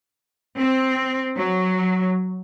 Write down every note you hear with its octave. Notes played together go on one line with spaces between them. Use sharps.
C4
F#3